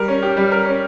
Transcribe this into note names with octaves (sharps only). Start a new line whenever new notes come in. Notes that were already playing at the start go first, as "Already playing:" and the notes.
Already playing: G3 A#4
C#4
G4
G3
A#4
C#4